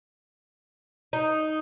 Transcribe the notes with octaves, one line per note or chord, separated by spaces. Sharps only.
D#4